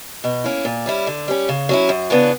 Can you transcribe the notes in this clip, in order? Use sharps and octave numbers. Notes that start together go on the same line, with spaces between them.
B2
A#3 C#4 E4
A#2
G3 C#4 E4
D3
G3 C#4
C#3
F#3 C#4 E4
F#2
C#3 E3 B3 D4